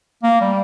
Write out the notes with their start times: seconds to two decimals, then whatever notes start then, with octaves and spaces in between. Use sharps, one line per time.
0.23 A#3
0.41 G3